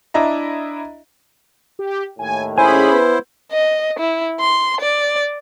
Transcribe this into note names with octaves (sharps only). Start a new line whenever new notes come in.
D4 E4 D#5 E5 A#5
G4
D#2 A2 G#5
C#4 E4 G#4 C5 G#5 B5
B3
D#5
E4
C6
D5